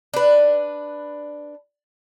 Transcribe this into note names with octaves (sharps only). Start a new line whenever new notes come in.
D4 B4